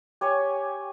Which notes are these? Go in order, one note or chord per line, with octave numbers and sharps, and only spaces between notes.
G4 C#5 G#5 C#6